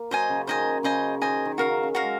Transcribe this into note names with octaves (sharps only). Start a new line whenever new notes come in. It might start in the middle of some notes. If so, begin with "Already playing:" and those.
Already playing: A#3
F#3 C5 D#5 G#5
C#3
D#3 C5 D#5 G#5
C#3
C#3 C5 D#5 G#5
D#3 C5 D#5 G#5
D#3
C#3 F#4 A#4 F5
D#3
C#4
F#4 A#4 F5
G#3